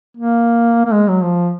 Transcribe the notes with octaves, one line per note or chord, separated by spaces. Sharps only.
A#3
A#3
G#3
F#3
F3